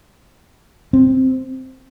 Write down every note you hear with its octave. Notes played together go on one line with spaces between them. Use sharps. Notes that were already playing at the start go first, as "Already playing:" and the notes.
C4